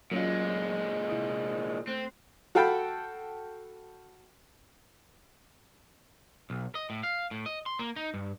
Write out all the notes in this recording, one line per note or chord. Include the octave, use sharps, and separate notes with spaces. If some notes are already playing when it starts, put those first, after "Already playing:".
A#2 F#3 G#3 C#4 F4
C3 E4 D#6
A3 C4 F#6
F#4 A4 F5 G5 A5 B5
B1
D#5
A2
F5
A2
D#5
C6
A#3
D#4
G2